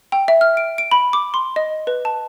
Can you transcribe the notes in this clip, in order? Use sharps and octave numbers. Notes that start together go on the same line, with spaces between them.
G5
E5
F6
D7
D7
B5
D6
C6
D#5
B4
A5